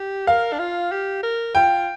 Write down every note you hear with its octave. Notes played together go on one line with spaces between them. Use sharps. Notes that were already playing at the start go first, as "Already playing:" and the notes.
Already playing: G4
A#4 F5
D4
F4
G4
A#4
F4 G5